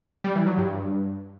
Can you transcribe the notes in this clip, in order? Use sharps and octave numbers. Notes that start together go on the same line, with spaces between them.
G3
E3
F#3
G2